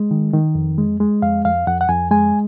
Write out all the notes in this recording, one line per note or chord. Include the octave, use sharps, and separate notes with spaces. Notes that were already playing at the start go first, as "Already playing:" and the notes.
Already playing: G#3
D#3
D#3
F2
G#3
G#3
F2 F5
F2 F5
F2 F#5
F#5
F2 G#5
G#3 G#5